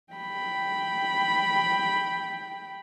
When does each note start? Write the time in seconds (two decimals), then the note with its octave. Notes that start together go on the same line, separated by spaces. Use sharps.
0.13 G5 B5